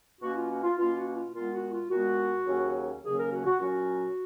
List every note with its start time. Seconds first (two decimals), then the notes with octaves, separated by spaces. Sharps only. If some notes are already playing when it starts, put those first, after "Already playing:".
0.21 B2 A#3 C#4 F#4
0.35 F4
0.50 F#4
0.63 F4
0.77 B2 A#3 C#4 F4
0.96 F#4
1.15 F4
1.33 A#2 G#3 B3 F4
1.53 F#4
1.72 F4
1.90 A#2 G#3 B3 F#4
2.47 D#2 C#3 F#3 A#3 C#4
3.03 D#2 C#3 F#3 A#3 C#4 G#4
3.18 A#4
3.32 F#4
3.46 F#4
3.59 A#2 F#3 C#4 F#4